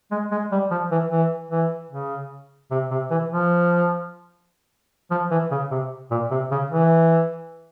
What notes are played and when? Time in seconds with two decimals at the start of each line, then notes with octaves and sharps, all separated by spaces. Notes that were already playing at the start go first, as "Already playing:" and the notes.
0.12 G#3
0.32 G#3
0.52 G3
0.71 F3
0.91 E3
1.11 E3
1.51 E3
1.91 C#3
2.71 C3
2.91 C3
3.11 E3
3.32 F3
5.11 F3
5.31 E3
5.51 C#3
5.71 C3
6.11 A#2
6.31 C3
6.51 C#3
6.71 E3